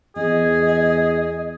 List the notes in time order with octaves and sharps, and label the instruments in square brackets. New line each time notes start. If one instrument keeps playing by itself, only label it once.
[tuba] E2 [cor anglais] G#4 [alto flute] D#5